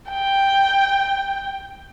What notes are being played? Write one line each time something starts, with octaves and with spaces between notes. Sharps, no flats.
G5